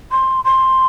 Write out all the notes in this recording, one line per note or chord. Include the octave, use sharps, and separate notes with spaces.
C6
C6